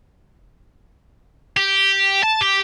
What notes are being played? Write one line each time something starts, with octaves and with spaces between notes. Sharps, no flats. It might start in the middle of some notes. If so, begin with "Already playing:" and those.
G4
A5
G4